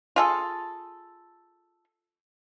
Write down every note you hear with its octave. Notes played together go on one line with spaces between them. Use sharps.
F4 G#4 A4